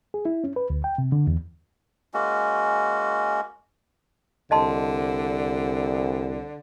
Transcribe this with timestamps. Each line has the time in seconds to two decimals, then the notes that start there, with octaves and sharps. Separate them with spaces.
0.14 G#4
0.25 E4
0.44 C#4
0.56 B4
0.70 D2
0.84 G5
0.98 C3
1.12 D3
1.27 E2
2.14 G#3 A#3 C#4 F#4
4.51 C2 D3 D#5 A5 C6